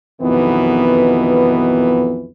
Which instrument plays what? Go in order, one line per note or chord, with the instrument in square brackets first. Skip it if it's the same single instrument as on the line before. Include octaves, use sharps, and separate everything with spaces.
[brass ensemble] B1 F2 B2 D#3 E3 B3